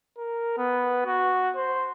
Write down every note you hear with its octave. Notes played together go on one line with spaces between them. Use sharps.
A#4
B3
F#4
C5